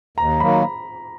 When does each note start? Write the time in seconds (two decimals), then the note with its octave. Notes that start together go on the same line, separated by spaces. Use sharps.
0.17 D#2 A#5
0.40 D#3 F#3 A#3 B5